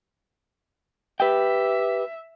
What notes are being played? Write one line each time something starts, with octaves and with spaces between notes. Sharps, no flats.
G4 B4 E5 G5